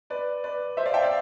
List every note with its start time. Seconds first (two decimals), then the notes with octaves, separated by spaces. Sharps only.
0.10 B4 D5
0.44 B4 D5
0.77 C5 E5
0.85 D5 F5
0.94 E5 G5
1.02 D5 F5